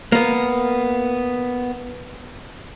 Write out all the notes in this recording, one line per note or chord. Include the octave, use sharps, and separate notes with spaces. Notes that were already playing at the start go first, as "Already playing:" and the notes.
A#3 B3